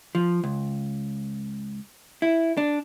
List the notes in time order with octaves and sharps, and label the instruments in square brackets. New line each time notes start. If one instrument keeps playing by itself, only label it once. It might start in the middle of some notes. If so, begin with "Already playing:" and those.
[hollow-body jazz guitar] F3
C#2
E4
D4